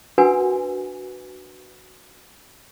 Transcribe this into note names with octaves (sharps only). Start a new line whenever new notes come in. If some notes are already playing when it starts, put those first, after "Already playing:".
D4 F#4 A#4 B4 F#5 G#5